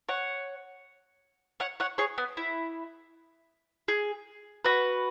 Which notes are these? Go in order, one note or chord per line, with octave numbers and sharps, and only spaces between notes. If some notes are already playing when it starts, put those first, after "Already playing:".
C#5 F#5
C#5 F#5
C#5 F#5
G#4 C#5
B3
E4
G#4
F#4 B4